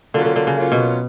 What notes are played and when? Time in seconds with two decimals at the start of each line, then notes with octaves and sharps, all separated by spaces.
0.14 D3 F#3 A#3 C#4 F4
0.25 D3
0.36 D3
0.47 C#3
0.57 F#3 A#3 C#4 F4
0.72 B2